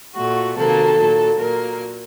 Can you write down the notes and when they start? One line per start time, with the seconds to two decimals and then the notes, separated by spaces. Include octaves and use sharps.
0.15 A#2 A3 F#4
0.57 C3 D#3 F#3 A#3 A4
0.98 A#2 F#3 A#3
1.39 A#2 F#3 A#3 A#4